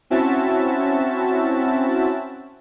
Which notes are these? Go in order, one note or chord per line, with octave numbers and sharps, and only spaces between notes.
C4 C#4 E4 F#4 E5 A5